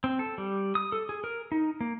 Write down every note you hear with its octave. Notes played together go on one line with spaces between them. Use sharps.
C4
A4
G3
D#6
A4
G#4
A#4
D#4
A#3